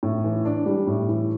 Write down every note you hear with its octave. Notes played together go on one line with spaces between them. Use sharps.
A2
E3
D4
G3
A2
E3